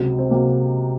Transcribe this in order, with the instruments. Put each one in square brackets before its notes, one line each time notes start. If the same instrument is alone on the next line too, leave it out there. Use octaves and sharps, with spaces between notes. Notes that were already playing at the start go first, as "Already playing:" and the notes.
Already playing: [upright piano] C#2 C3 F#3
C4
C3 F#3 A#3